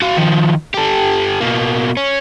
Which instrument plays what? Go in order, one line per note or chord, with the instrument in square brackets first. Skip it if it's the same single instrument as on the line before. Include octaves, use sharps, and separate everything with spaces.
[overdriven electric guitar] F#4 F5
D#3 F3
G4 A4
B2 A#3
C#4